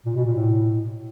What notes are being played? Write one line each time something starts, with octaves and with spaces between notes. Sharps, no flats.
A#2
B2
A#2
A2